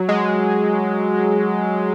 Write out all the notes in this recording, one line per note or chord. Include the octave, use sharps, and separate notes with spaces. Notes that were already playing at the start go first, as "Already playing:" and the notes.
Already playing: F#3
G#3